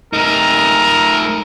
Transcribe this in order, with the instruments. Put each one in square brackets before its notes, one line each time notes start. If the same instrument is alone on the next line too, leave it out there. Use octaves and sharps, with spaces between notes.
[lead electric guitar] A3 D#4 [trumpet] A#4